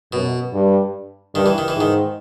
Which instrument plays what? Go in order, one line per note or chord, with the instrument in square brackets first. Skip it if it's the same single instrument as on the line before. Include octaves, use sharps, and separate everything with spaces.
[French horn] F#2 [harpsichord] B2
[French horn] G2
[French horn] G2 [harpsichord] D#3
[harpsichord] E3
D#3
E3
[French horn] G#2 [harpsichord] D#3